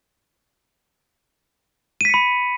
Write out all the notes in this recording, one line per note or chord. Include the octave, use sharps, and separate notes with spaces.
B5 B6 C#7 D#7